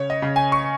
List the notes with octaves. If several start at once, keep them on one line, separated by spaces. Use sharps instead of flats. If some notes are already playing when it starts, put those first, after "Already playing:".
Already playing: C#3 C#5
D#5
C#3
G#5
C#6